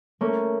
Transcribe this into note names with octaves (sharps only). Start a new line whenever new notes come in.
A3 A#3 C#4